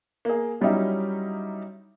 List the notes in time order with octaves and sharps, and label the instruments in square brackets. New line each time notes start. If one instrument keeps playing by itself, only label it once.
[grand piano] A#3 G#4
F#3 G3 C#4 D#4 E4 G4